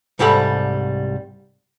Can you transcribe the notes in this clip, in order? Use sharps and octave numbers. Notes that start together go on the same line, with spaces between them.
C2 G#2 G3 G4 A4 B5